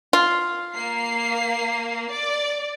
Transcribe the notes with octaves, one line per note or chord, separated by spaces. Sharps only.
F4
A#3 C7
D5